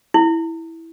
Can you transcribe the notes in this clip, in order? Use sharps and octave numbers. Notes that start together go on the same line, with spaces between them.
E4